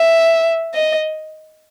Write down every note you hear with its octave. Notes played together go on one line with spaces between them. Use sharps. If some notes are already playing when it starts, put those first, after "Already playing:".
Already playing: E5
D#5